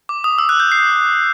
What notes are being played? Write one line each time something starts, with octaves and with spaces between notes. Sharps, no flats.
D6
D#6
E6
F#6
G6
C7